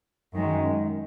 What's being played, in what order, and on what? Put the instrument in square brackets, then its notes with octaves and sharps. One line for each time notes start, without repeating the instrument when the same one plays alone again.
[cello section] F#2 D#3 G#3